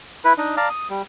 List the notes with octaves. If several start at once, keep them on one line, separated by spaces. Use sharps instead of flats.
E4 B4
D4 D#4 D#5
D5 F5 A5 A#5
D#6
G3